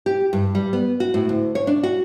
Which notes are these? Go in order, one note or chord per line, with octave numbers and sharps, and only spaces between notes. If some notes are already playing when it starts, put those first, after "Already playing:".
G4
G2
G3
B3
F#4
A2
D2
C#5
D4
F#4